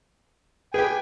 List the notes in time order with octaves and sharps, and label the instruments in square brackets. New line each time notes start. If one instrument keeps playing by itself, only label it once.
[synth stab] G4 G#4 [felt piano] B4 [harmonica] G5 G#5